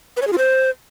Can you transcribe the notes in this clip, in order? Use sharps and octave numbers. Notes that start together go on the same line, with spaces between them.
B4
C#5
G#4
F4
C5